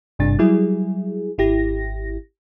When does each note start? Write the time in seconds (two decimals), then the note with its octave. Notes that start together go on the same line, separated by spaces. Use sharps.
0.19 G#1 G2 C3 D4 A6
0.39 F#3 G3 E4 G#4
1.38 G#1 E4 G4 A#6